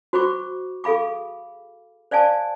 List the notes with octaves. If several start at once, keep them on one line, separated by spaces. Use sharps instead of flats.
F#4 C5 B5 C#6 D6
G#4 A4 F5 B5 D6
C5 D5 F5 G#5 A5